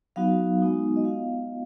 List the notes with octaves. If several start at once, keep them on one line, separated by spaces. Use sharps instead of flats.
F#3 B3 D#4 F#4 F5
G#3 B3 D#4 F#4
D#5
B3 F4 F5